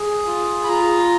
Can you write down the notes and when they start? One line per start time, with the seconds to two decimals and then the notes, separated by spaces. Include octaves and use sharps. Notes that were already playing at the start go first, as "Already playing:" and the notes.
Already playing: G#4
0.27 F4
0.64 B5
0.68 F4 A#5